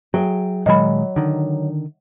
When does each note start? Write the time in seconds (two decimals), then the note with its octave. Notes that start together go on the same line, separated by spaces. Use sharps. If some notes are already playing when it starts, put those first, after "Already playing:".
0.14 F#3 G#4 E5 G5
0.66 A#2 D#3 F#3 G#3 D#5 B5
1.16 D3 D#3